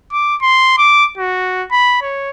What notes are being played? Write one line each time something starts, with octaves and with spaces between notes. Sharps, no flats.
D6
C6
D6
F#4
B5
C#5